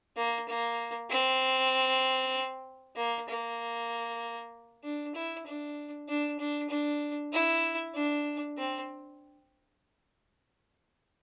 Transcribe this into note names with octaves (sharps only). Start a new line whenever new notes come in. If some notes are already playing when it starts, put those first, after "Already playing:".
A#3
A#3
C4
A#3
A#3
D4
E4
D4
D4
D4
D4
E4
D4
C4